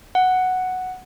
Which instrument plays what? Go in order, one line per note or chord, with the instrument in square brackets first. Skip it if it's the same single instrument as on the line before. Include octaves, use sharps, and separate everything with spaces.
[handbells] F#5